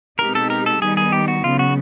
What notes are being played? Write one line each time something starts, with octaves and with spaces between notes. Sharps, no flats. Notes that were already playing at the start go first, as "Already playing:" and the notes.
B2 G#3 C4 D#4 G4 A#4
A4
A#4
A4
D#3 G3 B3 D#4 G#4
G#4
G4
F#4
C#3 F#3 B3 F4
F#4